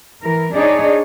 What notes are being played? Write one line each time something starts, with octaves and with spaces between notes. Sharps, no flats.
E3 A#4
D4 D#4 G#4 C#5 D5